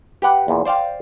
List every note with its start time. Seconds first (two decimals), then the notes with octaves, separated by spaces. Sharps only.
0.22 G4 B4 F#5 G5
0.48 E2 A#2
0.65 C5 D5 F5 G5